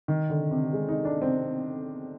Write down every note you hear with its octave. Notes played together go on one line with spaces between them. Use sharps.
D#3
D3
C3
G#3
D#4
D4
C4